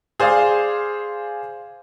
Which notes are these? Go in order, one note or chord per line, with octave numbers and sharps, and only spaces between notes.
G#4 C5 D5 F5